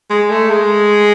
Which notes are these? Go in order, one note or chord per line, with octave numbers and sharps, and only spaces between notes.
G#3
A3
G#3